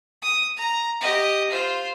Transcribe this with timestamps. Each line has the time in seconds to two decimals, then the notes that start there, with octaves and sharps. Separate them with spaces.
0.22 D#6
0.57 A#5
1.01 G4 D#5
1.50 F4 C5